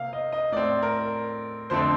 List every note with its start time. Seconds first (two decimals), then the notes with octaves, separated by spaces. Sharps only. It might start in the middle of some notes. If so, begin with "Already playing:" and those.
Already playing: C3 A#3 F5
0.13 D#5
0.32 D#5
0.52 A2 A3 C4 D5
0.82 A#4
1.70 F2 D3 A3 C4 C5